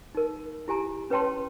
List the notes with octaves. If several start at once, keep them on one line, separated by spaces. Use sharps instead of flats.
D#4 A#4
E4 G4 G#5 A#5
C#4 B4 C#5 G5 A5 C6